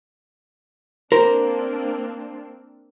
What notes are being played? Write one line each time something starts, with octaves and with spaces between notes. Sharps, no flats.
A#3 C4 D4 A#4 C5